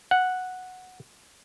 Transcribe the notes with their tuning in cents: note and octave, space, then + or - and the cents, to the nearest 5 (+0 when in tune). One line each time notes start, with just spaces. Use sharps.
F#5 -5